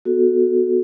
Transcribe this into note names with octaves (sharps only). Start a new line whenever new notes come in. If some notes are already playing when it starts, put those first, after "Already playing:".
B3 F#4 A4